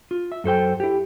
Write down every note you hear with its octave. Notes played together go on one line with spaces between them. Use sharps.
F4
E5
F#2 A4 C5 G5
E4 G4